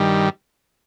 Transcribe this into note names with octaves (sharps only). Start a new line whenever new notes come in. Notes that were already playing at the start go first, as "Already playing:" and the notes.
Already playing: G2 D#3 G3